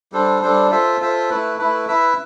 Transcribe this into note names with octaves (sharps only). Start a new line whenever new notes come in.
G3 D4 A4 C5
G3 D4 A4 C5
F4 A4 C5 E5
F4 A4 C5 E5
A3 E4 B4
A3 E4 B4
E4 B4 E5